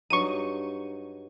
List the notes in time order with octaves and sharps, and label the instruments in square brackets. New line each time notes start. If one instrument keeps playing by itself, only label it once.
[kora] G2 F#3 D#4 [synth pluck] C#6 D#7